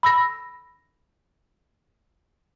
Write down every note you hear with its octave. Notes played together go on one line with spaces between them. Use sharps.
B5 E6 A#6